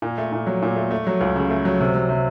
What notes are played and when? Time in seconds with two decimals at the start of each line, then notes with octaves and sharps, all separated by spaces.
0.02 A#2
0.18 A3
0.32 A#2
0.47 F#3
0.62 A#2
0.76 A3
0.91 A3
1.07 F#3
1.21 C#2
1.36 C#3
1.50 A3
1.65 F#3
1.81 C3
1.95 F#3
2.09 C3